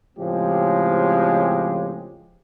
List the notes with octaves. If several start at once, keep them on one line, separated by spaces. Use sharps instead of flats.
A2 C#3 F3 G#3 C4 G4